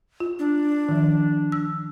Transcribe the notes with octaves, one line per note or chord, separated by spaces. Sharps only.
F4
D4
D#3 F3
E6